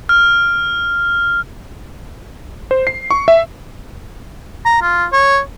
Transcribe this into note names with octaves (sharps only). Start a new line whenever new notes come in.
F6
C5
C7
C#6
E5
A#5
F4
C#5